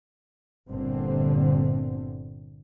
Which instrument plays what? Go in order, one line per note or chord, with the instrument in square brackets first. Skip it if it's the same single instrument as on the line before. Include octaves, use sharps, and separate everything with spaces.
[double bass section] G1 A#2 D3 C4